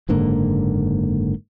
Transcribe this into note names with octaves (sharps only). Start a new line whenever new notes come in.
F#1 G#2 D3 A#3